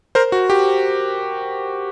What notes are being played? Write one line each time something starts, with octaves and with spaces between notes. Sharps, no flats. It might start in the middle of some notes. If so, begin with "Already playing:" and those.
A#4 C5
F#4
G4